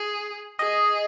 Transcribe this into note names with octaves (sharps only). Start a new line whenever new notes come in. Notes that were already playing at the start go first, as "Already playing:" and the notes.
Already playing: G#4
G#4 D#5